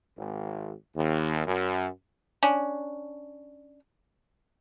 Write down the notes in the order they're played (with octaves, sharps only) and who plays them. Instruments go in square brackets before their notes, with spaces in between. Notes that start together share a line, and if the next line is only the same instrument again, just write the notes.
[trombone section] G#1
D#2
F#2
[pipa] C#4 D4